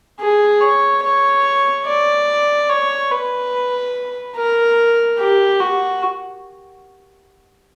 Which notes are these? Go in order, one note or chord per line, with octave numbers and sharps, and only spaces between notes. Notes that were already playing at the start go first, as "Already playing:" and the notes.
G#4
C#5
C#5
D5
C#5
B4
A#4
G4
F#4